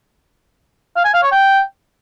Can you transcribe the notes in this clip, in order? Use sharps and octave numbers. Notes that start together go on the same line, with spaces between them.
F5
G#5
F5
C#5
G5